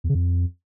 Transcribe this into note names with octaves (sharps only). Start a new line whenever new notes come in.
E2
C#3
F2